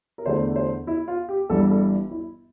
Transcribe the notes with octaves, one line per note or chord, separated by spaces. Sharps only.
A#4
E2 D3 A3 C5
C5
E4
F4
G4
G1 G2 E3 G3 A4
A4
E4